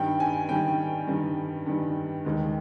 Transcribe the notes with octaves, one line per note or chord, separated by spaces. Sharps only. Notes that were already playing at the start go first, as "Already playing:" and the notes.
Already playing: G2 D#3 G3 G5
G#5
G2 D#3 G3 G5
G2 D#3 G3
G2 D#3 G3
D#2 D#3 G#3